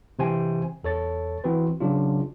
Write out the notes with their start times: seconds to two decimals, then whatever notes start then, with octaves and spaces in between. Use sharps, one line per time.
0.19 C3 E3 C5 G5 G#5
0.84 E2 A4 C#5 A6
1.44 E3 C4 F#4 B4 C5
1.80 C#3 F#3 D4 F4